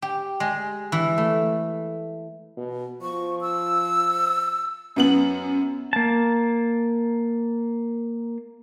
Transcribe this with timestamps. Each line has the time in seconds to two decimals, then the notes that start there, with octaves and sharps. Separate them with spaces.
0.02 G4
0.40 G#3
0.92 E3
1.18 A3
2.57 B2
3.02 F3 C#6
3.41 E6
4.96 F#2 B3 F#7
5.93 A#3 A5